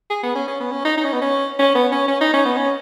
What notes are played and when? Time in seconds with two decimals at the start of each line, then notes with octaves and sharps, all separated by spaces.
0.10 G#4
0.23 B3
0.35 C#4
0.48 C#4
0.60 B3
0.72 C#4
0.85 D#4
0.98 D#4
1.05 C#4
1.13 B3
1.22 C#4
1.59 C#4
1.75 B3
1.92 C#4
2.08 C#4
2.21 D#4
2.33 C#4
2.46 B3
2.57 C#4